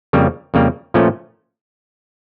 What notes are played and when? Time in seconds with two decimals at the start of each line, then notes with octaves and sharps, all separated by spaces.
0.13 F2 C#3 G3 A#3
0.54 F2 C#3 G3 A#3
0.94 A#2 F3 A3 C#4